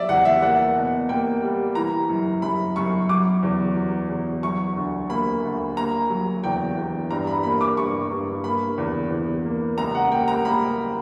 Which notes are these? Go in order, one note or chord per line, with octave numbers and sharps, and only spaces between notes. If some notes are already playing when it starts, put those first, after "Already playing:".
Already playing: F#3 D5 E5
E2 F#5
E5
A#3 F#5
B2
A#3 G5
G3
E3 A#5
F#2
F#2 B5
F#2 C#6
F#3 D6
E2
F#3
E2
F#3 C#6
D2
A#3 B5
D2
A#3 A#5
F#3
E2 G5
E2
G2 A#5
B5
A#3 B5
D6
G2 C#6
G2
A#3 B5
E2
E2
A#3
C#2 A#5
F#5
A#3 G5
A#5
A#3 B5